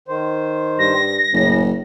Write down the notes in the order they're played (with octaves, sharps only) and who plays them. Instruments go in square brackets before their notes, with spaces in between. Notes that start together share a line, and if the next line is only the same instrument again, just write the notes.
[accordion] D#3 C5
[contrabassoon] G2 [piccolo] A#6
[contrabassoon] F#1 [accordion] A2 C#3